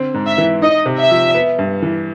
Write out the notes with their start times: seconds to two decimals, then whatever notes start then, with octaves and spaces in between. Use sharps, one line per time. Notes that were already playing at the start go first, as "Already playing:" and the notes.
Already playing: D3 C4
0.14 G#2
0.26 E5
0.38 E3
0.62 D#4 D#5
0.86 C3
0.98 E5
1.11 F3
1.35 B3
1.59 G2
1.82 E3